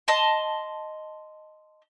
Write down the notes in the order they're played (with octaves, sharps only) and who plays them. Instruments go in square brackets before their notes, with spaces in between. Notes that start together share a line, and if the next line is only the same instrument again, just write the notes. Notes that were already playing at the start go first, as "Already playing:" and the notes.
[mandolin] D#5 A5 C6